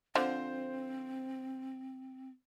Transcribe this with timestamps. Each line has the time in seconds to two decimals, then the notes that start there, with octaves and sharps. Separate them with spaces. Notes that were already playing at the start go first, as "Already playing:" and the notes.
0.15 D3 F3 C4 C5